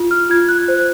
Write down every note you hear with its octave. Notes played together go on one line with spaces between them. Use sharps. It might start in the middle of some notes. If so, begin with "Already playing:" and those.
Already playing: F4
F6
F4 G#6
F#6
C5